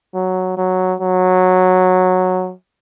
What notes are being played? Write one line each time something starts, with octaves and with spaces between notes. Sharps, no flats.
F#3
F#3
F#3